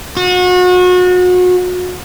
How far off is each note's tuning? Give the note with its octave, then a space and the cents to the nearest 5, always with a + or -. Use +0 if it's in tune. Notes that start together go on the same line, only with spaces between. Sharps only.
F#4 -35